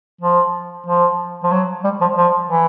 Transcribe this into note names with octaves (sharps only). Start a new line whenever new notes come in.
F3
F3
F3
F#3
G3
F3
F3
E3